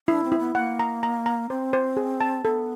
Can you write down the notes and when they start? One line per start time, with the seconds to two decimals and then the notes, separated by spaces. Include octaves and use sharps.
0.08 D4 E4
0.24 C4
0.32 E4
0.39 B3
0.55 A#3 F#5
0.79 A#5
1.03 A#5
1.26 A#5
1.50 C4 C5
1.73 C5
1.97 G#4
2.21 A5
2.44 B3 A4